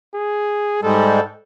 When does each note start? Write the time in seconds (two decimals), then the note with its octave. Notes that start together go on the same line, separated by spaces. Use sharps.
0.14 G#4
0.83 G#2 G3 G#3 A4